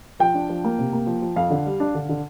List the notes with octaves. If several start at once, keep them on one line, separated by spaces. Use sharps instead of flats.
F3 G5
D4
F3
A#3
C3
A#3
F3
F3
F2 F5
D3
G3
D4
D3
D3